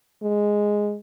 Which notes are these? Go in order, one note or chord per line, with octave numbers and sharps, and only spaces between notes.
G#3